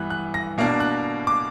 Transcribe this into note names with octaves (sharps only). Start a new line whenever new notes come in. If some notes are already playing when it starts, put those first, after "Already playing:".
Already playing: G2 E3 B3 F#6
F#6
A#6
B2 A#3 D4
F#6
D6